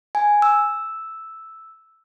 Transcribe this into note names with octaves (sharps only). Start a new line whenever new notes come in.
G#5
E6